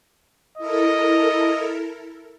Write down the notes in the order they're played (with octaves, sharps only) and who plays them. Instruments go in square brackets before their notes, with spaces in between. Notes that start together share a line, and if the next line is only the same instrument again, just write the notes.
[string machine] E4 A4 A#4 [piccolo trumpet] D#5